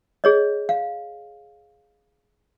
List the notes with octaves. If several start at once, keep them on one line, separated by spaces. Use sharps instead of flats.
G#4 C#5 D#5
F5